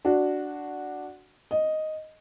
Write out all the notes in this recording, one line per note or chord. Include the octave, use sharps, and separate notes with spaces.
D4 F#4
D#5